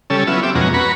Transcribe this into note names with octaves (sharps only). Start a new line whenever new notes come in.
C#3 G3 C#4 A4 E6
F#3 B3 E4 F4 E5
C4 G4 E5 D6
F2 B2 G#3 C#4 F#4 A#5
F#4 B4 A#5 B5 C#6